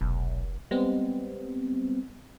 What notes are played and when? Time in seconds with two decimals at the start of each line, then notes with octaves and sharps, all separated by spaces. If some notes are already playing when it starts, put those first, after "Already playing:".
0.01 F1 B1
0.71 G3 G#3 B3 C4